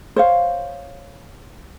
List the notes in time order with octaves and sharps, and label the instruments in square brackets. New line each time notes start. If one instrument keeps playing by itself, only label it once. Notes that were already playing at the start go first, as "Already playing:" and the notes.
[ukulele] C5 C#5 F5